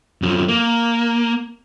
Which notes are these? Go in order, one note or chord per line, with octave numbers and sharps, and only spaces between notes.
F#2 F3
A#3